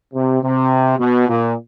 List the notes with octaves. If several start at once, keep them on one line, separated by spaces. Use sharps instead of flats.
C3
C3
B2
A#2